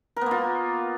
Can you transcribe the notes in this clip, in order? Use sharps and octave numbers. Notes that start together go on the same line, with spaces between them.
A#3 B3 F4 A#4